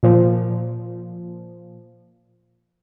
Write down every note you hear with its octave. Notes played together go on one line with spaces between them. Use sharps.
A#2 F3